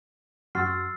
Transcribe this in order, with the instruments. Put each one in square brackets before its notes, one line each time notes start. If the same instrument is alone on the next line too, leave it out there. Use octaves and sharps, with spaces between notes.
[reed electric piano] F#2 F#4 C6 [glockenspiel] E6 C7 [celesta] F6 A6